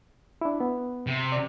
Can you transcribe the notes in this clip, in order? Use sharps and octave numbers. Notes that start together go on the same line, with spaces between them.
D4 E4
B3
C3
D5